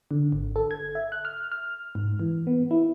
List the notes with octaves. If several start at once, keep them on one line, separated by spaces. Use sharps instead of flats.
D3
G#1
A4
G#6
E5
F#6
F6
F6
G#2
E3
B3
E4